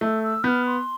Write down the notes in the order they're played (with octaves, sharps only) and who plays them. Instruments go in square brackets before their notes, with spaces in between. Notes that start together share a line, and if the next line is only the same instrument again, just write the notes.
[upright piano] A3 [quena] E6
[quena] E6
[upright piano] B3 [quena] F6 G6
[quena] C6